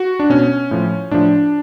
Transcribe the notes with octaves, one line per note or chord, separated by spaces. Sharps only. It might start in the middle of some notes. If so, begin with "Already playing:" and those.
Already playing: F#4
D4
B2 C#4
A2 F3
A2 F3 D4